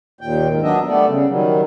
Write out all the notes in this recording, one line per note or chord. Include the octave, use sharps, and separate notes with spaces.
D#2 A#2 G5
G#2 D#3
F#3 B3 D4 D#5 E5
G3 A3 B3 A4 D5
C#3
D#3 F#3 G3